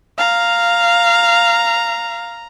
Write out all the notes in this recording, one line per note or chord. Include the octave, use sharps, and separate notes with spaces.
F5 A#5